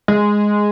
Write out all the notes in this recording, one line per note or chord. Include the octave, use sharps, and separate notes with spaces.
G#3